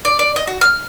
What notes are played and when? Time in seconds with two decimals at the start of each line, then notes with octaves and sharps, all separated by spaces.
0.05 D5
0.19 D5
0.36 D#5
0.47 F#4
0.61 F6